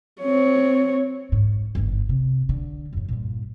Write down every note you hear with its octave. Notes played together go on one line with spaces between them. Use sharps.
C4 C#5
G#2
G1 G#2
C3
D3
F#2 A2
G2 A#2